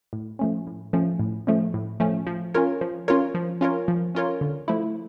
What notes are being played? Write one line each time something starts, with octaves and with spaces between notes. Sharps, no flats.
A2
F3 A3 C#4
A2
F3 A3 C#4
A2
F3 A3 C#4
A2
F3 A3 C#4
F3
C#4 F4 A#4 C#5
F3
C#4 F4 A#4 C#5
F3
C#4 F4 A#4 C#5
F3
C#4 F4 A#4 C#5
D3
F3 A3 E4